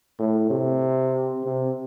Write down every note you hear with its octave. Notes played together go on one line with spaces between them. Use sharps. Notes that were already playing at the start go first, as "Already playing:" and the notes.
A2
C3
C3